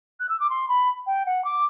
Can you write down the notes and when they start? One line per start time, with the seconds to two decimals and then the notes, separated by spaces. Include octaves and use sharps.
0.20 F#6
0.29 E6
0.40 D6
0.50 C6
0.69 B5
1.07 G5
1.26 F#5
1.45 D6